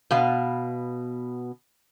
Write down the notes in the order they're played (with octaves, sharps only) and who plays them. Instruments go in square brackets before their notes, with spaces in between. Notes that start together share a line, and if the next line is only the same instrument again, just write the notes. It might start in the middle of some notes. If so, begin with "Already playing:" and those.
[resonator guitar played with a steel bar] B2 B3 F5